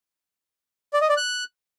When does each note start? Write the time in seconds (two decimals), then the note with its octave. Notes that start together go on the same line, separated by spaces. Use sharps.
0.93 D5
1.01 D#5
1.09 D5
1.17 F#6